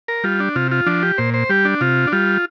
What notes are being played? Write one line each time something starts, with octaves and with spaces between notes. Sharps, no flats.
A#4
G3 F4
D4
C3 F4
F4
F3 D4
G4
A#2 C5
C5
G3 G4
D4
C3 F4
D4
G3 F4